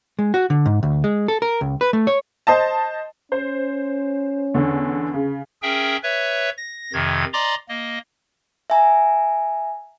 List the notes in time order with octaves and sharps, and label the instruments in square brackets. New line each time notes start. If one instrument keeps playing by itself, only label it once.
[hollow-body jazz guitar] G#3
F#4
D3
G#2
D2
G#3
A4
A#4
C#2
B4
A3
C#5
[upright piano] C5 D#5 A5
[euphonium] C#4 [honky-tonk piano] C5
[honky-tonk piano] E2 D3
C#3
[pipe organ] C#4 G#4 A#4 E5 G5
B4 C#5 E5
A#6
F2 C3 D#3 G#6
D5 D#5 A#5 C6 D6
A#3 D#5
[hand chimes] E5 G#5 A#5